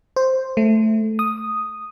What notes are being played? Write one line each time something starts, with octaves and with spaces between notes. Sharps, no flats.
C5
A3
D#6